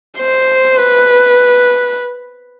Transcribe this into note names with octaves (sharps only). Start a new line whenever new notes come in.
C5
B4